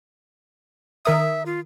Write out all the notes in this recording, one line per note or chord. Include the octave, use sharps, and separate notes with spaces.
D#3 A#4 E5 D#6
F4